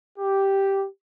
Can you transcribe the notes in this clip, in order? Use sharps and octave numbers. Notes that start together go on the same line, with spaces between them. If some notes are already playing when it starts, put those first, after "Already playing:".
G4